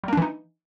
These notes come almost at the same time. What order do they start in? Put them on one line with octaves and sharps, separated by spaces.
G3 A#3 D4 E3 D#4